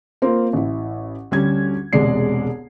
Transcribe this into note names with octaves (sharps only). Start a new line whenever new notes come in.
A#3 C4 F4
A1 E4
D2 G3 C#4 G#6
E1 C2 G#3 D5 C7